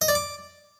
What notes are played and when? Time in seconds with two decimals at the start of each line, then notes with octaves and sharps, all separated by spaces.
0.02 D#5
0.08 D5
0.15 D6